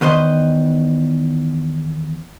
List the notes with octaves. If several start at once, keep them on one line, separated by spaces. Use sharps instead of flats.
E2 D#3 B4 C5 D#5